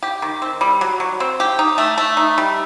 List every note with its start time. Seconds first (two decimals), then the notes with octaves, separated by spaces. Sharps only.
0.03 G4
0.22 D#3
0.42 C4
0.61 G3
0.81 F#3
1.00 F#3
1.20 C4
1.40 G4
1.59 D#4
1.78 A3
1.98 A3
2.17 D#4
2.38 G3